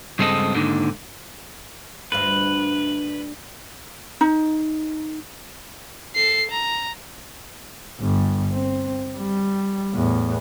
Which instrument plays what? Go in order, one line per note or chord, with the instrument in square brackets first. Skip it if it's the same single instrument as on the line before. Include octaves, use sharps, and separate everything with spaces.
[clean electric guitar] C#2 G2 G#3 C4 A4 D#5
D#2 G#2 D3 D#3
[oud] D2 G2 F4 [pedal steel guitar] B4
[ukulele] D#4
[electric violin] A4 C7
A#5
[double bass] G1 G2
C4
G3
E2 A2